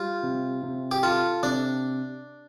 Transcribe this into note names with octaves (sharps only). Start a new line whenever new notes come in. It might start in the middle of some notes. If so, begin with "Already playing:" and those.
Already playing: G3 F4
C3
C3
G4
F4 A4
C3 D4